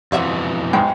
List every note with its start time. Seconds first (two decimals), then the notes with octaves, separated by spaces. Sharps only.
0.12 F2 B2 E3 F3 E5 F#5
0.73 B1 G#2 G5